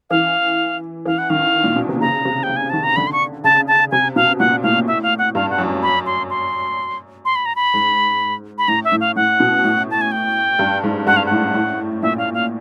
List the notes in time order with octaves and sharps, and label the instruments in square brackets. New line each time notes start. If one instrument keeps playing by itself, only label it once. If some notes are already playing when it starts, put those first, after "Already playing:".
[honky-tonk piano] E3 [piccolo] F5
[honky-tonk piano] E3 [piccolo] F5
[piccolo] F#5
[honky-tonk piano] D#3 [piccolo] F5
[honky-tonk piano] A#2
B2
C3
[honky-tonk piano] C#3 [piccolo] A#5
[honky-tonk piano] C3
[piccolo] G5
[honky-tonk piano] C#3
[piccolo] G#5
[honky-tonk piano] D#3 [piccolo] A5
[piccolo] A#5
[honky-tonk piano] D3 [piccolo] B5
[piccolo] C6
C#6
[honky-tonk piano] C#3 [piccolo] A5
[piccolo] A5
[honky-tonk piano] C3 [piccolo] G#5
[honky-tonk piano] B2 [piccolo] F5
[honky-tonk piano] A#2 [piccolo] F#5
[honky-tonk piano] A2 [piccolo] F5
[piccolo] E5
F5
F#5
[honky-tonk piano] G2 [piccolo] F5
[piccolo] F#5
[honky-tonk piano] F#2
[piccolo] B5
C6
C6
C6
B5
A#5
B5
[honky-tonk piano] G#2
[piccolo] B5
[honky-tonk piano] A2 [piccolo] A#5
[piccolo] E5
[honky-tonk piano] A2
[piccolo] F5
[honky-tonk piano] A2 [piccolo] F#5
[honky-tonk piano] B2
A2
[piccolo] A5
G#5
G5
[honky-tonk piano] G2
G#2
[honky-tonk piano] G2 [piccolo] F#5
[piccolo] F5
F#5
[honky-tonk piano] A2
A2
[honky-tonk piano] A#2 [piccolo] E5
[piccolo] F5
F5